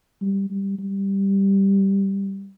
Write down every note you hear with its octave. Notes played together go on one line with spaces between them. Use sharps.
G3
G3
G3